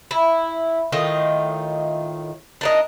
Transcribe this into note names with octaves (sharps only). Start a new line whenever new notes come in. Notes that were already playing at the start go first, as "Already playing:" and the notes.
E4
A2 D#3 F4 D#5
D4 A#4 D#5